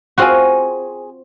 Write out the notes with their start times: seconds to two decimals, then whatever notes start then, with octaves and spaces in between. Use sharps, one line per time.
0.18 C4 F4 F#4 G#4 G#5